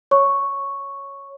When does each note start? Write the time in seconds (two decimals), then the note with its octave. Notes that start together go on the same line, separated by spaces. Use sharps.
0.11 C#5 C#6